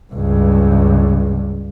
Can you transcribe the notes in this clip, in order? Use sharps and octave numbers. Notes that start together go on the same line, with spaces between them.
C#2 G2